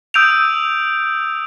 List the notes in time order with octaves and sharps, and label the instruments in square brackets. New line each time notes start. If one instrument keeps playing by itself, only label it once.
[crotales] D#6 E6 G6 D7 D#7 F7